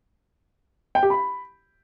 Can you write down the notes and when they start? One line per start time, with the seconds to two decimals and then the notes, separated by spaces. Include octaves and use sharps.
0.95 G5
1.03 G4
1.10 B5